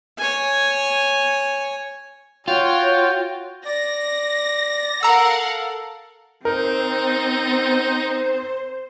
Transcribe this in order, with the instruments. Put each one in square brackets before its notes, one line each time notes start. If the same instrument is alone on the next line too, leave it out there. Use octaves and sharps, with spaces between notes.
[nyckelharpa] C#5 G#5
[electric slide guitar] F4 [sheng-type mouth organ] F#4 G5 [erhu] C#5
[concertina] D5 [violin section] A#6
[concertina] A4 [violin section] A#4 F5 F#5 [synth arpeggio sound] A#5 E6
[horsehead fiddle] C4 [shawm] D#4 [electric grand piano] A#4 [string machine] C5